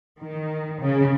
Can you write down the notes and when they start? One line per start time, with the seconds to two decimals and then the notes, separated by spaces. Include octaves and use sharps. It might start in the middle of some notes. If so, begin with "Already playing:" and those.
0.20 D#3
0.81 C#3